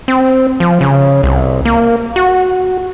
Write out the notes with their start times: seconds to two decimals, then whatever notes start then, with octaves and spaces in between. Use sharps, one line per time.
0.08 C4
0.60 F3
0.81 C#3
1.23 C2
1.65 A#3
2.16 F#4